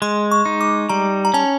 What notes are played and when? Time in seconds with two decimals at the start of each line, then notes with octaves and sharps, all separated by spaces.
0.02 G#3 C6
0.31 C#6
0.46 D#4
0.61 D6
0.89 G3 A#5
1.25 A#5
1.34 C#4 A5